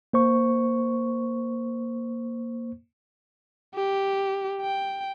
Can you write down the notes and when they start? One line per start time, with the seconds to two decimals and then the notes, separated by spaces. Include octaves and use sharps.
0.13 A#3 C5 C#6
3.75 G4
4.61 G5